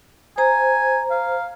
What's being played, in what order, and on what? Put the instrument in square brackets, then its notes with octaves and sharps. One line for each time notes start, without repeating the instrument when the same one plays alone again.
[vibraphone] C5 A#5 [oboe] G#5
[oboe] F5